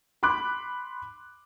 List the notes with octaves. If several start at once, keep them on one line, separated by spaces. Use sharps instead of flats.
B5 C6 D6 F#6